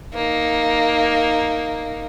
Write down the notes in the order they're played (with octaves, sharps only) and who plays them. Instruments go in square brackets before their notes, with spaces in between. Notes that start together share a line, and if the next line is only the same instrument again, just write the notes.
[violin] A#3 D#4